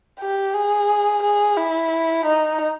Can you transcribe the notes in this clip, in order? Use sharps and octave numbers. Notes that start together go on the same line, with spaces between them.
G4
G#4
G#4
E4
D#4